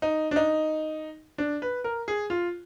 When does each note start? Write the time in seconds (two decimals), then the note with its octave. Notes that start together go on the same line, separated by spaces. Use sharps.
0.02 D#4
0.31 D4
0.36 D#4
1.38 D4
1.62 B4
1.84 A#4
2.08 G#4
2.30 F4